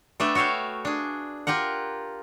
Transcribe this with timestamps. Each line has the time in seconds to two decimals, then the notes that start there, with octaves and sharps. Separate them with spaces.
0.20 A3 B3 D4 D5 E5 G5
0.35 F#4 C#5 E5 F5 G5
0.85 D4 G#4
1.47 F4 G4 A#4 F#5